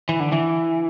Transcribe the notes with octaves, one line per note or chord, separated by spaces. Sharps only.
E3
D3
E3